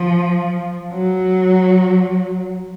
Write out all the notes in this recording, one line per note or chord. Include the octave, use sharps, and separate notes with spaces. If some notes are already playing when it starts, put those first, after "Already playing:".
Already playing: F3
F#3